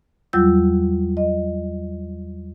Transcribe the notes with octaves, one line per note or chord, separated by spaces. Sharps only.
E2 F#3 G3 F4 E6 G6
D#5